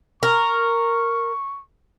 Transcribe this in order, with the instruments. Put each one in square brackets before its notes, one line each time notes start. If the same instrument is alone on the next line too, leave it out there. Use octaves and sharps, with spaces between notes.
[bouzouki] A#4 [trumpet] C#6